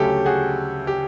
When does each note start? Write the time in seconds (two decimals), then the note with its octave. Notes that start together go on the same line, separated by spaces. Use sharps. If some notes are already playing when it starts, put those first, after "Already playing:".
Already playing: D2 C#3 F#3 A3 C#4 G4 A4
0.26 F#4 G#4
0.87 G4